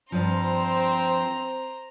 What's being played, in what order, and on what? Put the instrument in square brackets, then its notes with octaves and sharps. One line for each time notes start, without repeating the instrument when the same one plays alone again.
[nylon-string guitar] G2 F3 [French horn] C4 [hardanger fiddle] C5 A#5